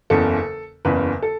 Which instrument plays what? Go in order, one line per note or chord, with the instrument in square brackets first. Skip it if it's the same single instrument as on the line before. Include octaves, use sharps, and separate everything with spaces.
[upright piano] F#1 E2 C#3 A4
F#1 E2 C#3 B4
A4